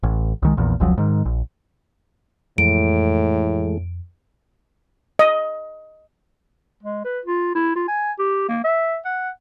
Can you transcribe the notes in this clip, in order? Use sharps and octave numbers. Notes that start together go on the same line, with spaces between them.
A1
C2 D#3 G#3
A#1 E2 A#2
F1 C#2 F3 F#3
G#2 D#3
A#1
F2 A2 E3 G#3 A3 D7
D#5
G#3
B4
F4
E4
F4
G#5
G4
A#3
E5
F#5